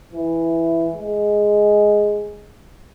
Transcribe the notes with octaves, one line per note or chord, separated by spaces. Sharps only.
E3
G#3